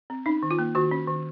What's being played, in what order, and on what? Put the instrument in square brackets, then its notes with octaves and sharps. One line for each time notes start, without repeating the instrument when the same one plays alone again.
[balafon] C4
C#4 D#4
D#3
F4
A#3
D#3 F#4
C#4
D#3